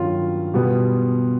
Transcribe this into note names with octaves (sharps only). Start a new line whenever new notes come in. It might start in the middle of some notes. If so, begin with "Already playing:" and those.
Already playing: G2 D#3 F#3 C#4 F4
B2 G3 B3